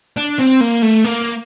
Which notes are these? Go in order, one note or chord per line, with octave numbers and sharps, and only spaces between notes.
D4
C4
A#3
A3
A#3